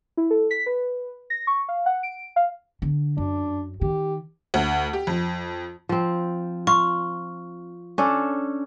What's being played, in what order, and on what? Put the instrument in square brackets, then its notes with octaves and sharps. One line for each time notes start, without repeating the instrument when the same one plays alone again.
[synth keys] E4
A4
B6
B4
A#6
C#6
F5
F#5
D7
F5
[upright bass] D3
[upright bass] F#2 [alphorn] D4
[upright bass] D#3 [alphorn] G4
[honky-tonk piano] D2
G4
F2
[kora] F3 C4
[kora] F4 [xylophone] C#6
[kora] C#4 D4 A4